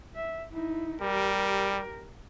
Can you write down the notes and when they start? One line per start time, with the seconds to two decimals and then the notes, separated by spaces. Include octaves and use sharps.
0.15 E5
0.53 D#4 E4
1.02 G3 G4 A#4